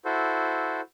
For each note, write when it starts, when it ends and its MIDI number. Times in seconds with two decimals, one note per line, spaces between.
0.05 0.81 64
0.05 0.81 66
0.05 0.81 69
0.05 0.81 72